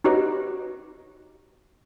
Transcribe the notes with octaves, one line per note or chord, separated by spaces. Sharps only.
D#4 F#4 G4 B4 C#5 D#5